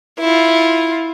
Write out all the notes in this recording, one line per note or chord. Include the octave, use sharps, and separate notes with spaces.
E4 F4